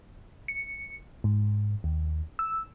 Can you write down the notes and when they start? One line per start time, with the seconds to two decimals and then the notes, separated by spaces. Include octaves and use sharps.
0.48 C#7
1.24 G#2
1.84 D#2
2.39 E6